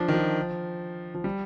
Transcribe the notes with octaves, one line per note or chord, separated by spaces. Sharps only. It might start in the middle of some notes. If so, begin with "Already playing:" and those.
Already playing: F3 D4
D#3
F3
F3
G3